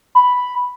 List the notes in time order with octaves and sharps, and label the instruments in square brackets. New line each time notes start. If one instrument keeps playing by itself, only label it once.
[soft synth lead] B5